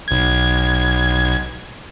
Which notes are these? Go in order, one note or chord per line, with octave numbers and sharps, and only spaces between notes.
B1 G#6